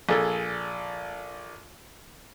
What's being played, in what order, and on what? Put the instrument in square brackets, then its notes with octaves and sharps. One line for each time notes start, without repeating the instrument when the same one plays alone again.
[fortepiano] A#1 G#4 A4